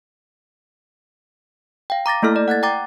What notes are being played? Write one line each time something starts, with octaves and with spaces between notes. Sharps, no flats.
F5 G5
A#5 D6 A6 A#6
A3 A#3 E4 A4 F6
D5
F#5 F#6 G#6 A6
G5 A#5 D6 A6